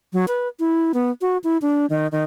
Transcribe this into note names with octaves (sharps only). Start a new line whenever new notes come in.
F#3
B4
E4
B3
F#4
E4
D4
D#3
D#3